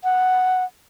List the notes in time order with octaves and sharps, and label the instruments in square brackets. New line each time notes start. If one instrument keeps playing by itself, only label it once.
[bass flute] F#5